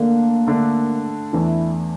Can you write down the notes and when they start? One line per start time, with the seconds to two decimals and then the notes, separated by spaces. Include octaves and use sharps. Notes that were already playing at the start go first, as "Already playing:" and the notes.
Already playing: D3 A3 A#3 D4 A4
0.47 D3 A3 D4 A4
1.33 E2 E3 A3 D4 E4